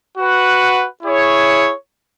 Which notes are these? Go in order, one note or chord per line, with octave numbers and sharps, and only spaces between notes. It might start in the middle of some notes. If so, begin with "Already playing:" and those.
F#4 B4 F#5
E4 G#4 C#5